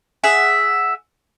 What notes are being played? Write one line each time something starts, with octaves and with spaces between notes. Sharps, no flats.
G#4 E5 F#5